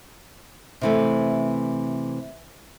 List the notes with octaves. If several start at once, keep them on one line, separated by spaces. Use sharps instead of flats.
C3 E3 A3